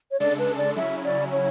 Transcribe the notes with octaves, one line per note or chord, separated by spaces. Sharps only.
C#5
C#3 G#3 D4 A4 D5
B4
D5
C#3 F#3 C#4 E4 E5
D5
C#5